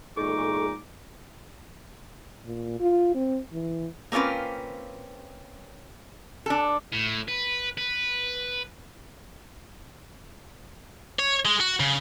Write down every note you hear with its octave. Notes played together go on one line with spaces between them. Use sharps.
E2 A#2 G#3 D#4 G#4 A4 C#6 D6
A#2
F4
C4
E3
A#3 C4 C#4 F4 B4
D4 A4
A2
B4
B4
C#5
G#3
F#4
C#3